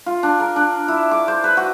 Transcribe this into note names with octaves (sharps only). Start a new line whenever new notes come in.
F4
D4
A#4
D4
E4
D6
C5
B4
F#4